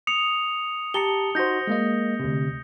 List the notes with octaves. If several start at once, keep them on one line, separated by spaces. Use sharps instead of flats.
D#6 C#7 F7
G4 A5 A#5 C#7 G7
D#4 F#4 C5 G6 A#6
G#3 A#3 D#5
D2 C3